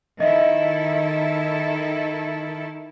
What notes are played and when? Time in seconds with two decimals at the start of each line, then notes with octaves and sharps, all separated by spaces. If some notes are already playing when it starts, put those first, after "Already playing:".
0.20 D#3 E4 A4 D#5 E5